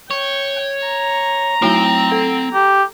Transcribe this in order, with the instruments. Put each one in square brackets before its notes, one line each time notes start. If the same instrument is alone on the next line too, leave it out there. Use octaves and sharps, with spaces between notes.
[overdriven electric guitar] C#5 [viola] G5
[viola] A#5
[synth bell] F#3 A3 E4 [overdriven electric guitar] C4 G5
[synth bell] A4
[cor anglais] G4